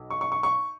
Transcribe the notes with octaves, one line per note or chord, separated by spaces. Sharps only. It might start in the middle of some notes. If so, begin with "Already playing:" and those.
Already playing: B1
C#6
C#6
C#6
C#6